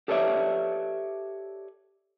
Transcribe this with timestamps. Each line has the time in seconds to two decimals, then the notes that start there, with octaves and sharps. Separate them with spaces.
0.08 G4 A4 B4 C#5 D5 E5